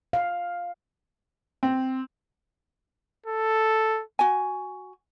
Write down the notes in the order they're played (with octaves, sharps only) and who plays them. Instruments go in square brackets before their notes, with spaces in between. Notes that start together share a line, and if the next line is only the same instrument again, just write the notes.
[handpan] F5
[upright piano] C4
[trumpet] A4
[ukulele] F#4 G#5